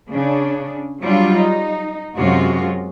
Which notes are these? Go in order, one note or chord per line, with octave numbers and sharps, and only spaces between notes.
C#3 D4
F#3 G3 D4 F4
D#4
F#2 C3 G#3 F4 F#4